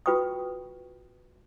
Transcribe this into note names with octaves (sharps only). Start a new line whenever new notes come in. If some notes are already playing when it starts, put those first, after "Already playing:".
F4 F#4 B4 G5 C#6 D#6